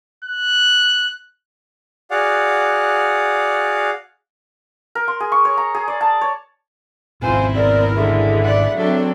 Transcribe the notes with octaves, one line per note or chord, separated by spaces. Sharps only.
F#6
F#4 G#4 D5 F5 F#5
A#4
C6
G#4
C#6
C#5
A#5
G#4
D5
A5
C#5
G#1 B2 C4 E4 F4 C5 G#5
B3 A#4 D5
D3 E3 G#3 E5
D5 F#5
F#3 C4 D4 A4